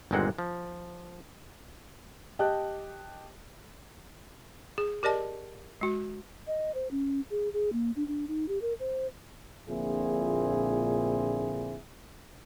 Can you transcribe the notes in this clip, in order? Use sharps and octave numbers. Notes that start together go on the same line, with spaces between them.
G1 D#2 A#2 G#3 C4 F#5
F3
G4 D#5 G5 A5 F#6
G#4
G4 A#4 D5 D#5 A5
G#3 F#4
D#5
C5
C#4
G#4
G#4
A#3
D4
D4
D#4
G4
A#4
C5
A#1 A#2 D3 C4 E4 G#4